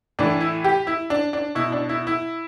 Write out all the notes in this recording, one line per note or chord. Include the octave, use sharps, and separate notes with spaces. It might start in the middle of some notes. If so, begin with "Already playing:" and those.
A2 E3 D4
E4
G4
E4
D4
D4
B2 E4
D4
E4
E4